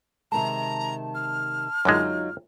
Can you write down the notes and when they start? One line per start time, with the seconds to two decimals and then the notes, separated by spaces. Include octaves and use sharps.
0.32 C3 D#3 G#3 A5 A#5
1.15 F6
1.85 F#2 D3 F#3 G#3 D#4 F4